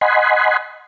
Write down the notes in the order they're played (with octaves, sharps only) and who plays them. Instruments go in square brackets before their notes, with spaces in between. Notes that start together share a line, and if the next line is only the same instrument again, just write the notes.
[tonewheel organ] D#5 F#5 G#5 B5 C6